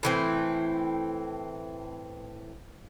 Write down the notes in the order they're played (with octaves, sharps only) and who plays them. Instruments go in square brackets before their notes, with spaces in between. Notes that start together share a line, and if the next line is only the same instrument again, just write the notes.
[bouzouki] A2 E3 C4